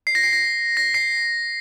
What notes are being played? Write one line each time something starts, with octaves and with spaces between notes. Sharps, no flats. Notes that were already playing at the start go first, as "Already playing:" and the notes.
C7
A#6
C7
A#6
A#6
C7